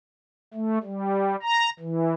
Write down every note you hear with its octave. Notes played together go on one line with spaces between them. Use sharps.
A3
G3
A#5
E3